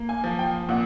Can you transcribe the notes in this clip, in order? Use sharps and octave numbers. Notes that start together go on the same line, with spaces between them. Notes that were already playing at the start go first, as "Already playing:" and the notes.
Already playing: A#3
G#5
F3
G5
A#2 F#5